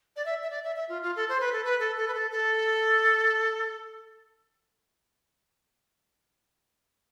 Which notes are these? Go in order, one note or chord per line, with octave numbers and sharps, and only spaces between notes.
D5
E5
E5
D5
E5
E5
F4
F4
A4
C5
B4
A4
B4
A4
A4
B4
A4
A4